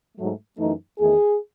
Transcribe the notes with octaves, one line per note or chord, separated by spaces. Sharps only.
G#2 F#3 A3
F#2 E3 A3 D#4
E2 D#3 A3 D#4 G#4